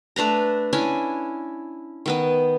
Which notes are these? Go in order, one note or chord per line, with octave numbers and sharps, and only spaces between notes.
A3 D4 B4 A#5
C#4 D4 E4 G#5
D#3 B3 D#5